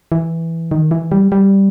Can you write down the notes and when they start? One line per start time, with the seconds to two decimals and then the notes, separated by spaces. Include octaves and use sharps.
0.12 E3
0.71 D#3
0.91 E3
1.12 G3
1.32 G3